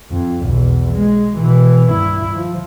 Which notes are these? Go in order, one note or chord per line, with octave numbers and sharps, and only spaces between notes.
F2
B1 E2
G#3
B2 E3
G2 E4
F3